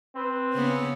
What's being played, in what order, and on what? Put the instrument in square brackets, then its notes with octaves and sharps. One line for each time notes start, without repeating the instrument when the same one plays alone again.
[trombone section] C4 B4
[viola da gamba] C#3 B3 C#4